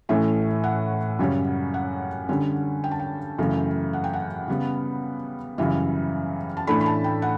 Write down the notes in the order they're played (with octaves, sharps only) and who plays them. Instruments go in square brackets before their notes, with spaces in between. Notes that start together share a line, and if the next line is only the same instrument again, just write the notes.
[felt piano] A2 E3 A3 C#4 E5
F#5
F#2 C#3 G3 C#4
F#5
D3 G3 C#4
G5
A5
G5
F#2 C#3 E3 A3
F#5
G5
F#5
C#3 G3 B3
F#2 C#3 E3 G3 E5
A5
A2 E3 A3 D4 B5
B5
A5
G5
F#5